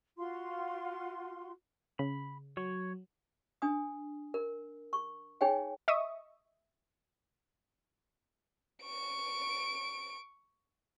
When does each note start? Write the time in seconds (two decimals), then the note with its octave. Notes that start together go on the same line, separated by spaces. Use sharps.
0.17 F4 F#4 C6
1.99 C#3 B5
2.57 F#3 C#5 C#6
3.62 D4 G#5 D#6
4.34 A#4
4.93 C#6
5.41 D#4 G#4 C#5 G5 G#5
5.88 D#5 E5 C#6 D#6
8.83 C#6 D7